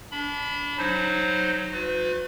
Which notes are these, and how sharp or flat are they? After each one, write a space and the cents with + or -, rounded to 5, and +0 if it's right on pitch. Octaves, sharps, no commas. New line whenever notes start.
D4 -30 B5 +0
F#3 +0 D#4 +0 C5 +0
F#4 -45 B4 +40